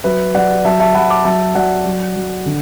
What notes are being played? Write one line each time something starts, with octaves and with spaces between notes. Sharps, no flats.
F#3 B4 E5
F#3 D5 F#5
F#3 E5 A5
E5 A5
F#3 F#5 B5
A5 D6
F#3 E5 A5
F#3 D5 F#5
F#3
F#3
D3